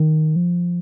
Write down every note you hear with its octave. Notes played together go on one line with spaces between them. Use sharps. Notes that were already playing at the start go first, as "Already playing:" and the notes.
Already playing: D#3
F3